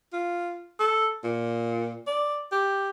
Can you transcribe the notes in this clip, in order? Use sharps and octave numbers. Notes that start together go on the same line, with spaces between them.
F4
A4
A#2
D5
G4